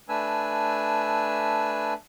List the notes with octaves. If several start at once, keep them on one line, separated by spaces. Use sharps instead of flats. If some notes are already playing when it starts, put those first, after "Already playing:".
A3 D4 B4 G#5 E6